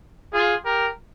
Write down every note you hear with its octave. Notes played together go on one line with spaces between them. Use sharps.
F4 G#4
G4 A#4